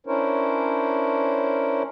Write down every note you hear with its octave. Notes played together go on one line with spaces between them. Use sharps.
C#4 D4 E4 A#4 C5 C#5